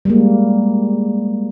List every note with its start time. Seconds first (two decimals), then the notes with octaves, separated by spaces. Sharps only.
0.05 G3 G#3 A#3